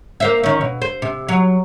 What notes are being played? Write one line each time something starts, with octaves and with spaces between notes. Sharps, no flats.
A#3 C5 E5
D#3 C#4
B2
C5
C3
F#3